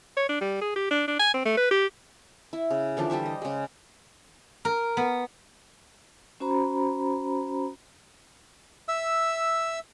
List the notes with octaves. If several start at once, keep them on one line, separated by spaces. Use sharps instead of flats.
C#5
D4
G3
G#4
G4
D4
D4
G#5
C4
A3
B4
G4
E4
C#3
D3 E3 F3 D4
G3 G4 C5 E5
D#5
C#3 G#3
A#4
B3
C#4 F#4 C5 A#5 B5
E5 E6